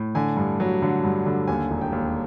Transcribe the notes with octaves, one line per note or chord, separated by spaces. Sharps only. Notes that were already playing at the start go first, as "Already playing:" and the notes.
Already playing: A2
D3 G#5
G2
F#3
D3
G2
D3
D#2 G#5
E1
G5
D#2